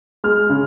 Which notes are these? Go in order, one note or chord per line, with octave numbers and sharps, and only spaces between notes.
G#3 F6
C#3